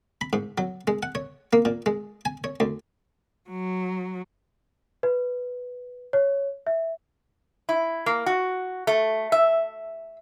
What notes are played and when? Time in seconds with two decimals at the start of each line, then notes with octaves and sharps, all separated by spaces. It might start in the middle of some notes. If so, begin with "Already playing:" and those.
0.21 B5
0.33 G#2
0.58 F#3
0.87 G#3
1.03 F#5
1.15 C#5
1.53 A#3
1.65 A#2
1.86 G#3
2.25 G#5
2.44 C#5
2.60 D2
3.50 F#3
5.03 B4
6.13 C#5
6.67 E5
7.69 E4
8.06 A#3
8.26 F#4
8.87 A3
9.32 E5